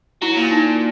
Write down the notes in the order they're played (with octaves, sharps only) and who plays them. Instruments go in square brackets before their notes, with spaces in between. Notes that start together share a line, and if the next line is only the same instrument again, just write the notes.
[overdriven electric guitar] F#3 [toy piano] E4
[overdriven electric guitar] A#2
[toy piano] D#4